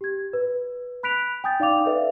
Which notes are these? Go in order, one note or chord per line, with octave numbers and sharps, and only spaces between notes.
G4 G#6
B4
B5 F#6 B6 D7 F7
G5 G#5 D#6 G6 A6
D#4 D5 F5 G5 D6 F7
A4 B4 D5 E5 F5